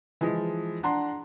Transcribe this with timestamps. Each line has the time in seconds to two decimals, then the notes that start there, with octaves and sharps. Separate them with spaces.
0.21 E3 F3 G#3
0.83 D4 F#5 A#5 C6